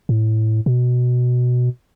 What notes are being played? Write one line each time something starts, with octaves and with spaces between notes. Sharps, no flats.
A2
B2